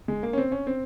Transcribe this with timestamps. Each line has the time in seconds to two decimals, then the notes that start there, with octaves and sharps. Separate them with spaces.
0.08 G#3
0.23 A#3
0.33 C#4
0.38 C4
0.52 C#4
0.67 C4